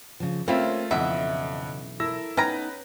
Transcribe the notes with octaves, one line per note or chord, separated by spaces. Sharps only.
C#3 F3
G3 A3 A#3 C4 C#4 F4 E5
B1 F2 C#3 E3 D#5 E5 F#5
E4 A4 A#4 E6 A#6
B3 C#4 D#4 B4 G5 A#5